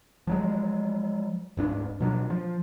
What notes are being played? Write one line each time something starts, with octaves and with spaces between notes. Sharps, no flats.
F3 F#3 G#3
D1 G#2 D4
B2 F#3 C#4 D4
F3